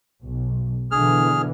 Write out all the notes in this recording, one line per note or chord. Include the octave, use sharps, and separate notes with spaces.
B1
B2 D3 E3 G#4 F6